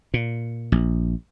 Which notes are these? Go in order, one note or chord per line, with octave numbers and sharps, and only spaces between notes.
A#2
A#1